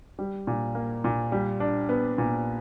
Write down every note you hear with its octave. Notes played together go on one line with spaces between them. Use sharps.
G3
A#2
A#3
A#2
G3
D4
B3
A#2